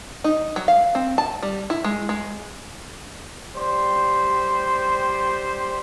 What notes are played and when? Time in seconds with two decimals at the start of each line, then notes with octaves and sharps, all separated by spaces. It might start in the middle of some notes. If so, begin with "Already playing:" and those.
0.24 D#4
0.56 F#3
0.68 F5
0.95 C4
1.18 A5
1.43 G3
1.70 E4
1.84 G#3
2.09 G#3
3.56 G3 C5